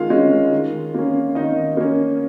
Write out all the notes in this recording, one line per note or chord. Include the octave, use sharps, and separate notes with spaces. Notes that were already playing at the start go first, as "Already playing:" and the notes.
Already playing: D#3 G#3 F4 F5
G#3 C#4
D#3
A#3 C#4
D#3 D#4 D#5
A#3 C#4